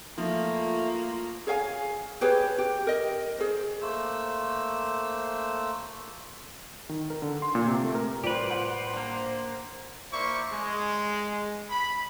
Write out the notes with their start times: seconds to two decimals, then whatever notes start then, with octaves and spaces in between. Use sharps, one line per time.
0.18 F3 A3 A#3 F4
1.47 G#4 C#5 F5 G#5
2.21 G4 G#4 B4 C#5
2.58 G4
2.87 A#4 D#5
3.38 G#4 C5
3.82 A3 A#3 C5 E6
6.89 D#3
7.10 A#4
7.22 D3
7.42 C6
7.55 A#2
7.67 C3
7.83 A3
7.95 A#4
8.24 A2 G3 F4 G4 B4 C5 D5
8.50 F#5
8.94 A#3 D4
10.12 A#3 E4 C5 D5 C#6
10.52 G#3
11.69 B5